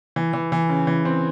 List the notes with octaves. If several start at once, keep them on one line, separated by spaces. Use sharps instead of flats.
E3
E3
E3
C#3
E3
C4